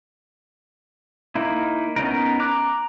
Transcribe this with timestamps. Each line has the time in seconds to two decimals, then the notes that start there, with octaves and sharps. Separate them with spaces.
1.35 A#3 D#4 E4
1.96 B3 C#4 D#4 A#4
2.40 A#5 D6 F#6